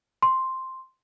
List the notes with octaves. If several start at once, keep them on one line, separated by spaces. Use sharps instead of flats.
C6